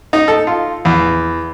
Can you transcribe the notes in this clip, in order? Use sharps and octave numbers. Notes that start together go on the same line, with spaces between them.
D#4
A4
F4
E2